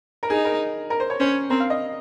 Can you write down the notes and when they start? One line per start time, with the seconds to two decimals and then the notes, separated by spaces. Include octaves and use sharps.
0.23 A#4
0.30 D#4 G#4
0.45 A#4
0.90 A#4
1.00 C5
1.10 C#5
1.20 C#4 C5
1.50 C4 A#4
1.60 F5
1.70 D#5